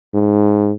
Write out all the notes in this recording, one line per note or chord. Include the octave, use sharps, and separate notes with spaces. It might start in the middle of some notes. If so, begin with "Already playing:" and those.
G#2